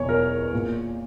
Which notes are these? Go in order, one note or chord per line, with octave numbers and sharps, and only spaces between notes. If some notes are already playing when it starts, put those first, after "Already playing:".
Already playing: E2 B2 C#5
A#4
A#2